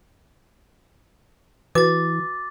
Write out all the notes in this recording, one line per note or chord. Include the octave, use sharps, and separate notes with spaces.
E3 F#4 B4 D6 A6